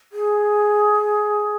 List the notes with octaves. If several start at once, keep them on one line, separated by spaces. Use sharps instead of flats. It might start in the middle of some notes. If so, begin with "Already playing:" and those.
G#4